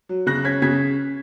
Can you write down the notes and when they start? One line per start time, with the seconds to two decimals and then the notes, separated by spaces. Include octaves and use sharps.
0.09 F#3
0.27 C#3 F#6 A#6
0.44 C#4 G#6 B6
0.62 C#3 G#6 B6